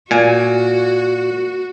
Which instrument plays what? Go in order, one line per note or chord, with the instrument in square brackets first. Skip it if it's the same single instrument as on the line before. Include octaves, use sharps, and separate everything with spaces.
[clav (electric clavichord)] A#2 G#5 [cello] F#4